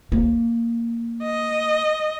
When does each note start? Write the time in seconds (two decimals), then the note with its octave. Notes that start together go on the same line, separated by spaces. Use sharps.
0.12 A#3
1.23 D#5